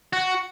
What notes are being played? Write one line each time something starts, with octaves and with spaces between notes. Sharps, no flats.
F#4